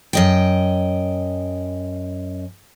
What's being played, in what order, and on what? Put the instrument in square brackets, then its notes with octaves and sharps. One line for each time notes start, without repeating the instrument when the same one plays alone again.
[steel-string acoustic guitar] F#2 D#5 G5